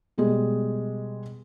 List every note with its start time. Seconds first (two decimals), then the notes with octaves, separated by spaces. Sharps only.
0.18 B2 G3 G#3 G#4